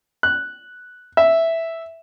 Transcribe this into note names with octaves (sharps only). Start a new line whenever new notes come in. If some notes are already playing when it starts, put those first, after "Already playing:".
F#6
E5